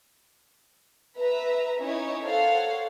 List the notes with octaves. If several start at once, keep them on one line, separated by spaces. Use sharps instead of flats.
B4 E5 A#5
C#4 D#4 E4 C#5
A4 A#4 C5 C#5 F5 F#5